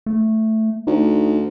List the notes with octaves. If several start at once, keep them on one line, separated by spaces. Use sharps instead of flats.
A3
D2 D#4